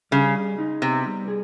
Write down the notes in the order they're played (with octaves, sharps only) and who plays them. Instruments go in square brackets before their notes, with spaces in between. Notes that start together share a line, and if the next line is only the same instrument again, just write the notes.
[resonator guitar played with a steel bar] C#3 [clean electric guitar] G3
[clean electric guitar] G#4
D#4
[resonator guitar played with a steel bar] C3 [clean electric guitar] B3
[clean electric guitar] G3
G#4